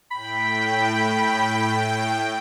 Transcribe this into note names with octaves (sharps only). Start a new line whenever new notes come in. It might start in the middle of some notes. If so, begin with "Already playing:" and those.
A2 G5 B5